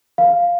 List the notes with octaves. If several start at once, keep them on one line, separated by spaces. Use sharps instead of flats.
F5